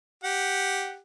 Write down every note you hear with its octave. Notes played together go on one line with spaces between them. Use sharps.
G4 F#5